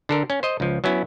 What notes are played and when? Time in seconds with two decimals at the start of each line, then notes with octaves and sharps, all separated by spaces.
0.09 D3 A4 A#4
0.30 C#4
0.43 C5 D#5
0.60 C#2 F3
0.84 F#3 B3 C#4 E4